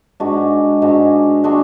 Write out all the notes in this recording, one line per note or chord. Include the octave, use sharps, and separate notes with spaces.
G#2 G#3 D4 F#4
G#2 G#3 D4 F#4
G#3 D4 F#4